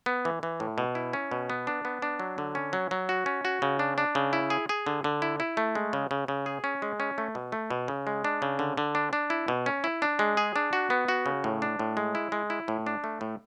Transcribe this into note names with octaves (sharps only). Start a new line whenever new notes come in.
B3
E3
E3
A2
B2
E4
C#4
B2
B3
D4
B3
D4
F#3
D3
C#4
F#3
F#3
F#4
C#4
F#4
C#3
D4
D4
C#3
E4
G#4
G#4
D3
D3
E4
E4
A3
G#3
C#3
C#3
C#3
G#4
C#4
G#3
C#4
A3
B2
A3
B2
C#3
G#3
D4
C#3
D3
D3
D4
D4
E4
B2
C#4
E4
D4
G#3
G#4
D4
F#4
B3
F#4
C#3
A2
D4
A2
G#3
E4
G#3
E4
A2
D4
A3
A2